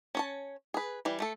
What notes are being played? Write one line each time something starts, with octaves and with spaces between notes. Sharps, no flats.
C#4 C#5 A5
G#4 B4
E3 G3
A3 A4